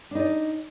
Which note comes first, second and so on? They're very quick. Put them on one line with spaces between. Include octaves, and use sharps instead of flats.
D4 D#4 D5